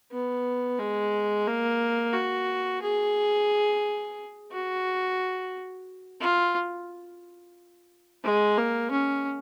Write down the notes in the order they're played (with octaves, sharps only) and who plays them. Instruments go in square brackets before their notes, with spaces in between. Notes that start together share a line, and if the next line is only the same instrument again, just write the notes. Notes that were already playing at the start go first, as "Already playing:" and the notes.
[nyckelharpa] B3
G#3
A#3
F#4
G#4
F#4
F4
G#3
A#3
C#4